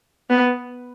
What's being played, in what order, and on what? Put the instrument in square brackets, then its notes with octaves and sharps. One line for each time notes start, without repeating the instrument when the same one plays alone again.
[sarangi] B3